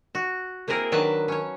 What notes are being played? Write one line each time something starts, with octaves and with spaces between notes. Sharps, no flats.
F#4
A#3 C4 E4 G#4 A#4
D#3 F#3 D4 B4 E5 A5
C#4 C#5